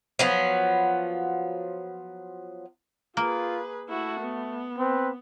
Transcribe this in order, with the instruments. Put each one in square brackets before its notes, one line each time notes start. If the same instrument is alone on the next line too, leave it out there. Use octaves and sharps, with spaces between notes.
[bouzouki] F3 F#3 B3
[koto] A#3 [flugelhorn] F4 [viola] G#4 B4
[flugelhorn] A3 [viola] E4 F#4
[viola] B3
[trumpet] C4 [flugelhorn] B4